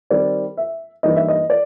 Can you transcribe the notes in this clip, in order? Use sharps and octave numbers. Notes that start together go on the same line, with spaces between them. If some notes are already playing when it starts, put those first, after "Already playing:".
D#3 G3 C4 D5
E5
G2 E3 G3 A#3 D#4 D#5
E5
D#5
D5